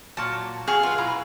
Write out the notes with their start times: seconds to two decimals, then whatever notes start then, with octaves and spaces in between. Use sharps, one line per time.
0.17 A#2 F#3 A5
0.68 F#3 G#4 F5
0.83 F4 B4 F5
0.98 B2 E4 A#5